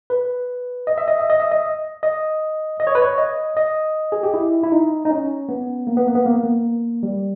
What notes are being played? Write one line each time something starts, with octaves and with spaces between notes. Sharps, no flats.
B4
D#5
E5
D#5
E5
D#5
E5
D#5
D#5
D#5
C#5
B4
C#5
D#5
D#5
G#4
G4
E4
E4
D#4
D#4
C#4
B3
A#3
B3
A#3
B3
A#3
B3
A#3
G3